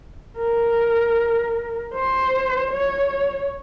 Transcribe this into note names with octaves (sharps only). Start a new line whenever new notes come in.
A#4
C5
C#5